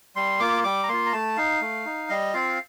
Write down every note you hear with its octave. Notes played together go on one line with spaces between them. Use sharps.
G3 C6
A#3 F4 D6
G3 D6
A#5
A#3 F4 C6
A#5
A3 A5
D#4 F5
A3
D#4
G3 D#5
C4 F4 F5